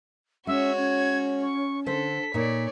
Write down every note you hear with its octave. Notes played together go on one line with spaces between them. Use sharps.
G#3 C#4 F#4 C#5 E5
C#4 G#6
C#6
D3 A4 C5 B6
A#2 D#4 C#5 D5